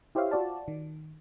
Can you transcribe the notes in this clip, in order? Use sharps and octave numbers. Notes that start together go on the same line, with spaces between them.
E4 G4 C5 C#5 E5 F5
F4 F#4 D5 A5
D#3